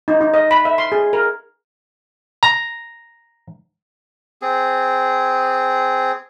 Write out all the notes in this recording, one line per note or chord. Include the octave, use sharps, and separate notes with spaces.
D#4
D#4
D#5
B5
E5
C6
G#4
A#4
A#5
C4 G#4